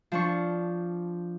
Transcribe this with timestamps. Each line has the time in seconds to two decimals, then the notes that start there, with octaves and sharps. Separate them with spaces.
0.12 F3 D4 C#6